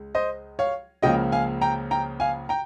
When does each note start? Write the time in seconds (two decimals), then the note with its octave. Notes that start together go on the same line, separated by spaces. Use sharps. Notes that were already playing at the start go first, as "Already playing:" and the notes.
Already playing: C#2 G#3
0.15 C5 D#5
0.59 C#5 F5
1.02 C#2 C#3 F3 A#3 D#5 G5
1.32 F5 G#5
1.61 G5 A#5
1.91 G5 A#5
2.20 F5 G#5
2.49 G5 A#5